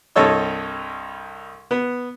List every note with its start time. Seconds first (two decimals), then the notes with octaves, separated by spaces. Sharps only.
0.16 C2 G2 A4 C#5 D#5 E6
1.71 B3